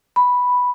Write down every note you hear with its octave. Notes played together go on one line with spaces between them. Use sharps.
B5